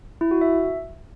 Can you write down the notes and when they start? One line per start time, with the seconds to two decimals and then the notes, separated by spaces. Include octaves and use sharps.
0.21 E4
0.31 F#4
0.41 E5